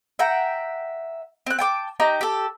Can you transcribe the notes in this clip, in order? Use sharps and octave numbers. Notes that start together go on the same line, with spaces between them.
E5 F#5 G5 A#5
C4 F#6
G5 A5 D6
D#4 G4 A#5
G4 A4